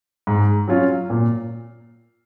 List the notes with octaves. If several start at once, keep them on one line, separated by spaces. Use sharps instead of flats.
G#2
F#3 C#4 F4
A#2